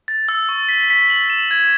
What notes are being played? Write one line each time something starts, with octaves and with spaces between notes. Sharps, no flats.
A6
E6
C#6
B6
B6
F#7
E7
G#6